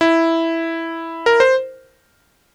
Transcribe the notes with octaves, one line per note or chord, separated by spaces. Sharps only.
E4
A#4
C5